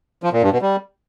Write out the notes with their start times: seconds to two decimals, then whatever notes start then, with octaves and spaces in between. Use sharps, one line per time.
0.23 F3
0.33 A#2
0.43 G2
0.52 B2
0.62 G3